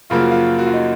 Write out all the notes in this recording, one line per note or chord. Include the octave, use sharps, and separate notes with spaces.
F#2 C#3 F3 A#3 F4
F#4
F4
F#4
F4
D#4